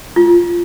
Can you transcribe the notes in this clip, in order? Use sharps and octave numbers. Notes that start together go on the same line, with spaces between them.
F4